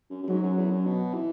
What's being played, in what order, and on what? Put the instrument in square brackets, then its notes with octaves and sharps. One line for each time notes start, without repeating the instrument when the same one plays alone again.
[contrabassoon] F#2
F#2
[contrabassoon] G#2 [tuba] F#3
[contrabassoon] F#2
E2
F#2
B2
E3